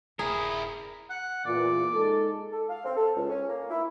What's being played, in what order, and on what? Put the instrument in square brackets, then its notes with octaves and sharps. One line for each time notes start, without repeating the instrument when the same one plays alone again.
[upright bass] D#1 G2 [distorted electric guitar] E4 A#4 [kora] G#4
[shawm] F#5
[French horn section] E2 A#2 [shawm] D5
[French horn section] G#3 D#4 A4
[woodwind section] A4
F5
C4
A4
C#2
C#4
A#3
E4